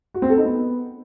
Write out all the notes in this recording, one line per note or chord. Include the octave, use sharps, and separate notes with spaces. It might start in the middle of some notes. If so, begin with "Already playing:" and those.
F#4
C4
A4
D#4
B3